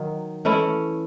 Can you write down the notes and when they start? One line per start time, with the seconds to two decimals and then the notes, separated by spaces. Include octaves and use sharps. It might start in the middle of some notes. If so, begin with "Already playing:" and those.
Already playing: D#3 F#3
0.45 E3 A3 C#4 E4